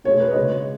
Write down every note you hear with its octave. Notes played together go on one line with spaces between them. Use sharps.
B2 G#3 C#5
B4
D#5
C#3 G#3 C#5